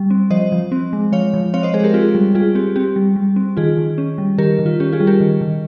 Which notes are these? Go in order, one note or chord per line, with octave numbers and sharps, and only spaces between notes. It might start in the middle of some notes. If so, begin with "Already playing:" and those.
Already playing: G3
C4
F3 C5 D#5
F3
C4
G#3
F3 C#5 F5
F3
C4 C#5 F5
C5 D#5
G#3 G#4 C5
G4 A#4
C4 F4 G#4
G3
G3 F4 G#4
C4 G4
C4 G4
G3
G3
C4
D#3 F4 G#4
D#3
C#4
G3
D#3 G4 A#4
D#3
F4
C#4 G4
F4 G#4
G3
G4 A#4
D#3
D#3